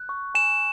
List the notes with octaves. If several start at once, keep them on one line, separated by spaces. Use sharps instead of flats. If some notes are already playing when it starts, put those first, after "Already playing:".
Already playing: F#6
C#6
G#5 E7